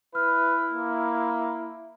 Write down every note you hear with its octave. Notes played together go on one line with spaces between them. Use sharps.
E4 B4 F6
A#3